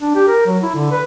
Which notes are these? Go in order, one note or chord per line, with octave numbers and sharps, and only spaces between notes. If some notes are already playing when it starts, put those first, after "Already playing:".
D4
G4
A#4
F#3
E4
D3
B4